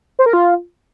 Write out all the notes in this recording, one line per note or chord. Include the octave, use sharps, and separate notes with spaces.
C5
A#4
F4